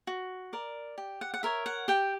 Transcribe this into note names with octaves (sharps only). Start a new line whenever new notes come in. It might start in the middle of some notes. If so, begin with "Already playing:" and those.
F#4
A#4 D5
G4
F#5
F#5
A#4 C#5 E5
F#5
G4 G5